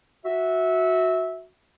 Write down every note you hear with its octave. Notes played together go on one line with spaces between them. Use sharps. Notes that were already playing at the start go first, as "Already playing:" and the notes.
F#4 E5